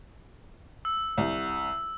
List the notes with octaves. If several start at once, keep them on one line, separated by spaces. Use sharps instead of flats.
E6
C2